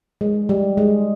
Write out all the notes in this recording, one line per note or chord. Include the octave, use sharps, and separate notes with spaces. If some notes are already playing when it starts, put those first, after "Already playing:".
G#3
G3
G#3